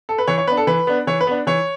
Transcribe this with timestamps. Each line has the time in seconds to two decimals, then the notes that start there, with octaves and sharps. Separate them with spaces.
0.09 A4
0.18 B4
0.27 E3 C#5
0.38 C#5
0.47 B3 B4
0.52 D4
0.57 A4
0.67 E3 B4
0.87 B3 D4
1.07 E3 C#5
1.21 B4
1.27 B3 D4
1.47 E3 C#5